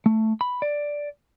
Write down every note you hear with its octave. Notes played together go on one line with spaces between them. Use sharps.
A3
B5
D5